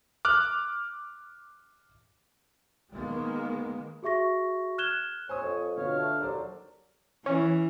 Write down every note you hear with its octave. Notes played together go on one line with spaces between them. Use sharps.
D6 F6 F#6
D#3 G#3 A#3 B3
F#4 G#4 E5 C#6 A#6
F6 F#6 G#6 E7 G7
C5 C#5 G#5 D#6
F2
B2 D3 F4 C#5 F5
A3 D4
D#2 F#3 A4 C5 D5
E3 C#4